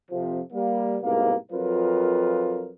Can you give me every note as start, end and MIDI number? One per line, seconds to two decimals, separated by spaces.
0.11 0.40 41
0.11 0.40 48
0.11 0.40 53
0.53 0.97 55
0.53 0.97 58
1.02 1.34 36
1.02 1.34 44
1.02 1.34 47
1.02 1.34 58
1.52 2.71 41
1.52 2.71 54
1.52 2.71 65
1.52 2.71 70
1.52 2.71 71